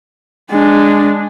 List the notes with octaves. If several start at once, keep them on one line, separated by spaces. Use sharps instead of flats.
G#3 D4